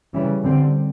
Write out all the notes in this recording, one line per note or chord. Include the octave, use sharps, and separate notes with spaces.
C#3 E3 G3
D3 G3 C4